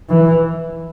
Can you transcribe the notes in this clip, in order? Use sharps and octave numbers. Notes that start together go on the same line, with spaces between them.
E3